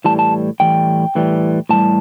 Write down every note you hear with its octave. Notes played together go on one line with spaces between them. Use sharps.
A2 E3 G3 A5
A5
A2 E3 G3 G5
A2 E3 G3
A2 E3 G3 A5